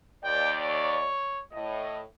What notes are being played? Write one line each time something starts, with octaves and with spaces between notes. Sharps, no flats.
D#2 D5 G5
C#5
A2 D#5